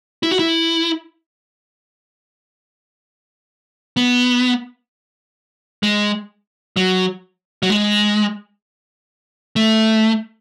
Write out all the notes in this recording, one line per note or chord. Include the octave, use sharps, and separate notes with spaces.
E4
F#4
E4
B3
G#3
F#3
F#3
G#3
A3